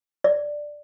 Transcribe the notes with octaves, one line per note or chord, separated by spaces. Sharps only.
D5